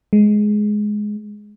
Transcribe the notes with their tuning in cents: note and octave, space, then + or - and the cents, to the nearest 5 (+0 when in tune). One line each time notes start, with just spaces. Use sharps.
G#3 +10